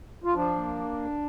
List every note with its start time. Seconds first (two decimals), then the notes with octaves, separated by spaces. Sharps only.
0.24 F4
0.34 F3 D4
0.56 A#3